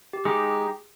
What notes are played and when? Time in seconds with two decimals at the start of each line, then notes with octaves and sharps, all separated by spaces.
0.13 G4
0.25 G#3 D#4 G4 G#4